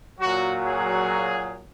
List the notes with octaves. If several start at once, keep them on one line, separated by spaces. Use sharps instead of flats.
A#2 F#3 F#4
G#4